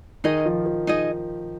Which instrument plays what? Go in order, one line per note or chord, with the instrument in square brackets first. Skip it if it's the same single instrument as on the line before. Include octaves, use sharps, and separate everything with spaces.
[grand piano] D#3 [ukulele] D#4 G#4 D#5
[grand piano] F3
F3
[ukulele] D#4 G#4 D#5